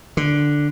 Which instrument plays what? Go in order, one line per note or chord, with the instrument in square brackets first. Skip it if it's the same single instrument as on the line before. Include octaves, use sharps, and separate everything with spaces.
[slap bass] D3